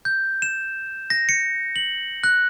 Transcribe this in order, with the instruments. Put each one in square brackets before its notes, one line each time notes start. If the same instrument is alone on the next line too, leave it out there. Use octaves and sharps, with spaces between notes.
[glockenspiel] G6
E7
A#6
C#7
F#7
F#6